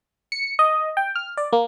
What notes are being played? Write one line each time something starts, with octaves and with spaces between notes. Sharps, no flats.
C#7
D#5
G5
F6
D5
A#3